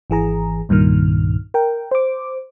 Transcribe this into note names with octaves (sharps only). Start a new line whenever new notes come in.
G#1 E3 G#4 A#5
C2 G2 A#2 D#3 F6
A#4 G5
C5 D6